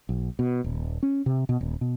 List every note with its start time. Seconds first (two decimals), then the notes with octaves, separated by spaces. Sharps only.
0.09 B1
0.39 B2
0.64 D#1
1.03 C#4
1.26 C3
1.49 B2
1.61 D#1
1.81 B2